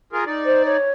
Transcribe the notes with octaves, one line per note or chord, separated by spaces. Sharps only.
F4 G#4 A#4
D#4 D5
C5
C#5